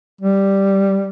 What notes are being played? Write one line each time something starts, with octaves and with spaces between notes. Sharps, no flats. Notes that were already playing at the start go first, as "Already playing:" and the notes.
G3